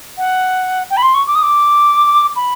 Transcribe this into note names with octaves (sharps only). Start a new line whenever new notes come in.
F#5
G5
B5
C6
C#6
D6
D#6
D6
B5